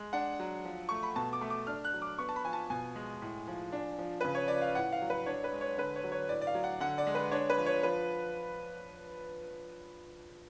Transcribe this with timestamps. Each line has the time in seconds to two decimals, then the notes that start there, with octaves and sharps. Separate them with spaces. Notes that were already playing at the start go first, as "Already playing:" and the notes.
Already playing: G#3
0.13 D4 F#5
0.40 F#3
0.65 F3
0.89 A3 C#6
1.03 B5
1.16 B2 A5
1.33 D6
1.41 A3
1.50 D6
1.67 D4 F6
1.85 F#6
1.94 F#3
2.02 D6
2.18 B3 C#6
2.29 A5
2.36 B5
2.45 F3 G#5
2.53 A5
2.70 B2 G#5
2.96 G#3
3.22 A2
3.48 F3
3.72 D4
3.98 F3
4.21 C#3 B4
4.35 C#5
4.48 F3 D5
4.62 F5
4.75 A2 F#5
4.92 F5
5.02 F#3
5.10 B4
5.26 D4 C#5
5.44 B4
5.52 G#3
5.61 C#5
5.78 D3 B4
5.96 C#5
6.04 F#3
6.12 C#5
6.29 A2 D5
6.42 D5
6.47 F5
6.55 F#3
6.64 F#5
6.80 D3 F#5
6.98 D5
7.07 G#3
7.15 B4
7.31 D4 C#5
7.50 B4
7.57 F3
7.66 C#5
7.83 F3 B4